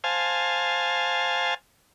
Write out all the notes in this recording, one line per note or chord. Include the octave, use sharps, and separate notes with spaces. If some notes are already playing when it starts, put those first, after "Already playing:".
C5 F5 G#5 A5